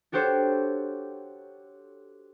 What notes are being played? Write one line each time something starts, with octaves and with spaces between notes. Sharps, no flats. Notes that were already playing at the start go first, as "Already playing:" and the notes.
D4 F#4 G4 A4 C5 C#5